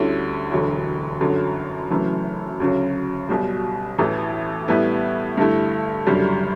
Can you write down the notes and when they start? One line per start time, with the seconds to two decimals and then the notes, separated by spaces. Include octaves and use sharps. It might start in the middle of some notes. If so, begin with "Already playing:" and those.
Already playing: D2 D3 G3 C#4 E4
0.51 E1 D2 D3 F#3
1.20 G1 F#2 D3 F#3
1.90 F#1 F#2 E3 A3
2.60 D2 C#3 F#3
3.29 B1 B2 G3
3.98 A1 A2 E3
4.68 A2 G3 B3 E4
5.37 G2 D3 A3 E4
6.06 F#1 F#2 D3 G3